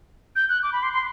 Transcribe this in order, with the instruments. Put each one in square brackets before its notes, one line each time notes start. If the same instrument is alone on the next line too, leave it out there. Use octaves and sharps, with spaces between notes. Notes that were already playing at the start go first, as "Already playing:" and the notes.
[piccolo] G6
F#6
D6
B5
C6
C6